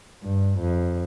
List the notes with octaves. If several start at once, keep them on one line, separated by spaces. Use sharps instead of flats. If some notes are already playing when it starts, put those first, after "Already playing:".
G2
F2